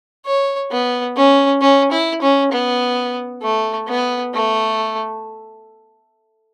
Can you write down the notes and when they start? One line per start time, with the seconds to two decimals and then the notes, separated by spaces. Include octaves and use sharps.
0.26 C#5
0.71 B3
1.17 C#4
1.61 C#4
1.92 E4
2.22 C#4
2.52 B3
3.43 A3
3.88 B3
4.34 A3